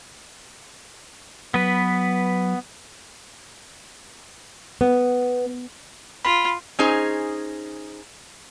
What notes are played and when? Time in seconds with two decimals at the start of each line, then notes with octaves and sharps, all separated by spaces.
1.54 F#3 B3 B4
4.81 B3
6.25 F4 B5
6.79 C#4 D#4 G#4 C5